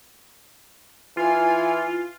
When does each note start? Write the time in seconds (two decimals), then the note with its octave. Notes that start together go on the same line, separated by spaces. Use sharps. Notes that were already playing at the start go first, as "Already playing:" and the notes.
1.17 E3 F4 G#5